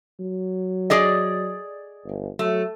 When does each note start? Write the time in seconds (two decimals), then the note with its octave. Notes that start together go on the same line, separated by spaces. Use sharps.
0.20 F#3
0.90 G#4 D5 D#5
2.05 G1
2.39 F#3 A3